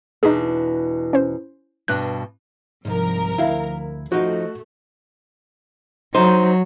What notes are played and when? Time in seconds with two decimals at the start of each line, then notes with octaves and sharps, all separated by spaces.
0.23 E2 B2 D4 D#4 G#4
1.13 C#4 C5
1.88 G2 B2 D4 F#6
2.85 C2 G#2 F3 A#4
3.38 D2 E4 F5
4.12 F3 A3 D#4 F#4
6.14 F#3 D#4 C5